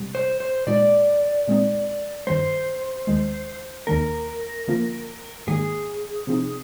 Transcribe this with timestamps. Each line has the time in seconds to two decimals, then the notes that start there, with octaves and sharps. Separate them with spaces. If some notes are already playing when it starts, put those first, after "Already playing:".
Already playing: C3 G3
0.15 C5
0.40 C5
0.67 A#2 G#3 D#4 D5
1.48 A#2 G#3 C4 D#4
2.27 G2 D#3 G3 C5
3.07 D#2 D#3 G#3
3.87 D#2 D#3 A#3 A#4
4.68 D3 F3 A#3 F4
5.47 G#2 D#3 A#3 G#4
6.27 C3 F3 C4 D#4